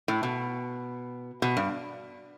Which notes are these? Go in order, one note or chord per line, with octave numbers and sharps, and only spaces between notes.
A2
B2
B2
G2